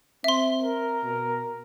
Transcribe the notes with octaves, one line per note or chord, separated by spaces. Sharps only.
C4 E5 C6
A#4
B2